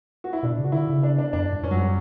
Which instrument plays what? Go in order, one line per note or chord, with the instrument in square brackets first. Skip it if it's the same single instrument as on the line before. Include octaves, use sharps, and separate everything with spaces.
[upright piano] F#4
E4
[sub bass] B2 [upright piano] D4
[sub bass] C#3
[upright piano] F#4
[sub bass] D3 [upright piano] E4
[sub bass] C#3
[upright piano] D4
D4
[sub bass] F#2 [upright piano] D4
[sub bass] G2
G2
[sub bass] F#2 [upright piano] C#4
[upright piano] F#3
G3